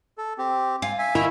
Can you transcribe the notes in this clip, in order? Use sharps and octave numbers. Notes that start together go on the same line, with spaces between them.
A4
C4 G4
F4 G#5
E5 G#5
D#3 E4